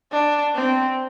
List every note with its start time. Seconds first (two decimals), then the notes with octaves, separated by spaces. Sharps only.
0.12 D4
0.55 C4